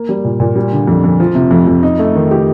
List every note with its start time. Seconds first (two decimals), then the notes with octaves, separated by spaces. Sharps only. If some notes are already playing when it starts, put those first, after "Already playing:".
Already playing: A#3
0.09 G3
0.25 A#2
0.40 A#2
0.56 G3
0.72 D3
0.87 F2
1.04 F2
1.20 F3
1.35 C3
1.51 F2
1.67 F2
1.83 D#4
1.99 A3
2.15 D#3
2.31 G4